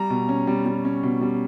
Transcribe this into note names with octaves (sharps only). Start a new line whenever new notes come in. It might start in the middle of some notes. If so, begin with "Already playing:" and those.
Already playing: G3 A#5
B2
C#4
G3
G3
C#4
B2
G3